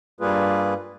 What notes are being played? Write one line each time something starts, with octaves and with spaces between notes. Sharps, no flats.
G2 G3 A#3 F4 G#4 B4